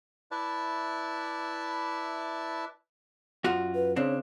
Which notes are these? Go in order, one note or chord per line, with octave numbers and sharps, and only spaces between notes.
E4 B4 D5 E5 A5
F#2 F4 F#4
B4
C#3 C4 D4 C#5